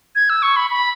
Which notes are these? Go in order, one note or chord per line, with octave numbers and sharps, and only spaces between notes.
G#6
E6
C#6
B5
B5